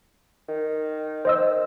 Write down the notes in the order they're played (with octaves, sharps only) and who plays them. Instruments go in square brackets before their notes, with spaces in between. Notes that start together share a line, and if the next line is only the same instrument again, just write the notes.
[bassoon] D#3
[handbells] C5 D#5 E6